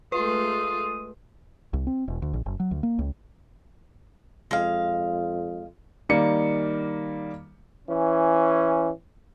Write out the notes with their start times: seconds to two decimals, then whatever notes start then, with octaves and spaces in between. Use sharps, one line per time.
0.12 G#3 A3 F4 B4 D#6
1.73 C2
1.87 C4
2.08 E1
2.22 D2
2.34 A#1
2.46 F#1
2.60 F#3
2.71 D2
2.83 A#3
2.99 C#2
4.51 F2 G#3 F5
6.09 D#3 G3 A#3 C#7
7.88 E3 C#4